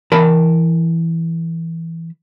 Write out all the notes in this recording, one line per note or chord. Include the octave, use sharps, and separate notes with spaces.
E3 A#4 A5 B5